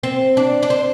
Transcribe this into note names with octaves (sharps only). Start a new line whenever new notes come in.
C4
D4
D4
C4